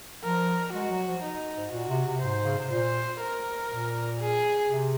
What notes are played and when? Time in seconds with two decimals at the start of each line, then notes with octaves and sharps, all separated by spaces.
0.24 F3 A#4
0.74 G#3 F#4
0.90 F#3
1.07 F3
1.23 D#4
1.56 G#2
1.73 A#2 F#4
1.89 C3
2.06 C3
2.22 G#2 C5
2.44 C#3
2.58 C3
2.71 A#2 C5
3.20 A#4
3.70 A#2
4.20 G#4
4.69 C3